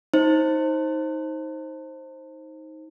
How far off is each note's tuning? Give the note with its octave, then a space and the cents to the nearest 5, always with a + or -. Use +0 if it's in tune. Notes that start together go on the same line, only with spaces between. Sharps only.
D#4 +20 C5 +15